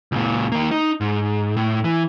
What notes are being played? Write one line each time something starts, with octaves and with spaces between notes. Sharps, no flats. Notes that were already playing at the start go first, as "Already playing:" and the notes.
C#2 A#2
D#3 A#3
D#4
G#2
A2
E3